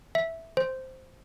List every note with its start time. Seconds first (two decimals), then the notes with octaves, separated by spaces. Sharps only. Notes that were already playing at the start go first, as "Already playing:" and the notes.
0.15 E5
0.57 C5